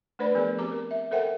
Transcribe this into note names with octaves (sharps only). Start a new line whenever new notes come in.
A3 D4 B4 C5 D5 B5
F3 B3 G#4 A#4 D5
C4 G4 A#5 D6
A#4
E5
A4 A#4 C5 E5 F#5 G5